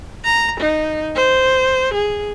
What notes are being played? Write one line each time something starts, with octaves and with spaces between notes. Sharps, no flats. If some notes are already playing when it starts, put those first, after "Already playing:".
A#5
D#4
C5
G#4